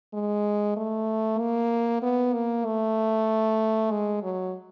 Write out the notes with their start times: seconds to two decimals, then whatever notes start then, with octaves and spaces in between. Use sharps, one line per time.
0.14 G#3
0.77 A3
1.40 A#3
2.02 B3
2.34 A#3
2.66 A3
3.91 G#3
4.23 F#3